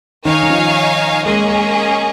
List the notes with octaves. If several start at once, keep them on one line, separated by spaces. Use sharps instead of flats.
D#3 D#4 C#5 F5 G#5
D#3
F3
G#3 A#3 C#4 G#4 D#5
G#3